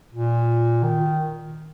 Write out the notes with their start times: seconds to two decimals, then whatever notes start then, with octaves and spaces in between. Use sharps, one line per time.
0.14 A#2
0.83 D#3